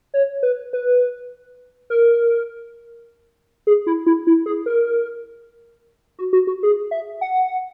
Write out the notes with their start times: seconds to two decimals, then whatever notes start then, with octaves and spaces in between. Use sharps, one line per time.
0.14 C#5
0.43 B4
0.73 B4
1.90 A#4
3.67 G#4
3.87 E4
4.07 E4
4.27 E4
4.46 G#4
4.66 A#4
6.19 F#4
6.33 F#4
6.47 F#4
6.63 G#4
6.91 E5
7.21 F#5